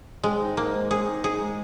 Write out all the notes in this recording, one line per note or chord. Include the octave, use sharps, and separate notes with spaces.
G#3 C4
D#4
G#2 A#3
G#3
C4 G#4
D#4
G#2 G#4
G#3